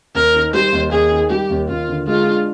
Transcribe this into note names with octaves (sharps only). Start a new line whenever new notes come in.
D#2 A#4
D#3
G3 C5
D#2
D#2 G#4
D#3
G3 G4
D#2
D#2 F4
D3
G#3 F4
D4